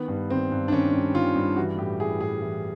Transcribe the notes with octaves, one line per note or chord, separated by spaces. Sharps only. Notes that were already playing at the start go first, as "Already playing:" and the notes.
Already playing: D#3 B3
G2
D#3 C4
G2
D4
D#3 C#4
G2
D#3 F4
G2
E3 F#4
A2 G4
E3 G#4
A2 G#4
E3